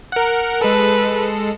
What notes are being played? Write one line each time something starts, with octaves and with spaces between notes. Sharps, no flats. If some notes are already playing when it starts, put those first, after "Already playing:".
A#4 F#5
G#3 A4 B4